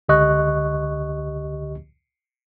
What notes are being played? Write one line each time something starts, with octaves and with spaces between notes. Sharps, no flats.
C#2 D3 G4 D#5 C#6 F#6